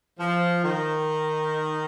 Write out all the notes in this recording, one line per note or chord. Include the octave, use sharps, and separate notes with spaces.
F3
D#3